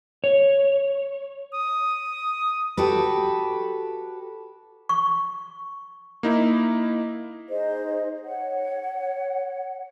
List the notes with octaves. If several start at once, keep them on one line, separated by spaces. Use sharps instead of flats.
C#5
D#6
F#4 G4 A4 B4
C#6
A#3 D#4 E4
D#4 G#4 C5 D#5
C#5 F#5